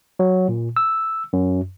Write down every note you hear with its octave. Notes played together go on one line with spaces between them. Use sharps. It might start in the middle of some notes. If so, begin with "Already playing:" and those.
F#3
A#2
E6
F#2